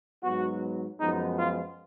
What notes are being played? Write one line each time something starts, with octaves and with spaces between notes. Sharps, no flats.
G#2 F#3 B3 F#4
F#2 F3 G#3 B3 D#4
F4